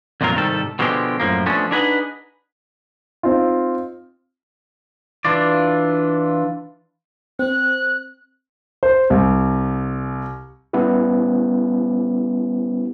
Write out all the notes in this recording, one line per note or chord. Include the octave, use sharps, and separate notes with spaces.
C2 F2 A#2 F#3 F4 A#4
C2 G#2 D#3 G3 A4
B2 D3 F3 G#3 G4
F#2 A2 F3 A#3
F3 A3 B3 C#4 D4
D4 D#4 G#4 B4 D#5 F#5
C4 D#4 F4
E3 D4 F4 D5
C4 F#6
C5
C2
G3 B3 C#4 E4 G4